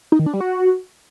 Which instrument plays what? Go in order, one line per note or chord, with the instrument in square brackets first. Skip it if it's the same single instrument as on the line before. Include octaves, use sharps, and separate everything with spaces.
[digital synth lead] D#4
D#3
D4
G3
F#4